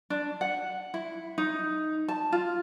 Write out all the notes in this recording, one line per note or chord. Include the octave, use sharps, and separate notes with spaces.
D4
F#5
E4
D#4
A5
F4